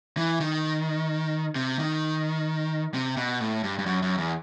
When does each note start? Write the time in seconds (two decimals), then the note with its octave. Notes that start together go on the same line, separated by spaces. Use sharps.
0.17 E3
0.40 D#3
1.56 C3
1.79 D#3
2.94 C3
3.17 B2
3.40 A2
3.64 G2
3.79 G2
3.86 F#2
4.02 F#2
4.18 E2